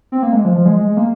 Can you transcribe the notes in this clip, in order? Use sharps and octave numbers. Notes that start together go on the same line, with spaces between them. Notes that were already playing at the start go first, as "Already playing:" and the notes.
C4
A#3
G#3
F3
F3
G#3
G#3
G#3
A#3